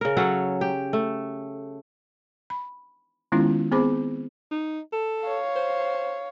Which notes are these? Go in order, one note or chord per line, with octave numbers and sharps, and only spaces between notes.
C#3 A#4
F#3 C#4 A4 F#5
G4
A3
B5
D#3 G#3 B3 C#4 E4 F4
B3 C4 G#4 C5 B5 D6
D#4
A4
C#5 F5
C5